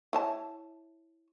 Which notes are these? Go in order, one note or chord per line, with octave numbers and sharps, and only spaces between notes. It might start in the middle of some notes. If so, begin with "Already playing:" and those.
E4 C#5 A5